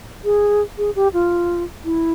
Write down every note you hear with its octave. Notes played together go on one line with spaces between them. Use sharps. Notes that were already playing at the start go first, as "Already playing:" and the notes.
G#4
G#4
G4
F4
E4